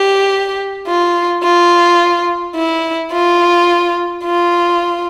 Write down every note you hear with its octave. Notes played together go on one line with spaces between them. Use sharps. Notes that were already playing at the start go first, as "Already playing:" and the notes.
Already playing: G4
F4
F4
E4
F4
F4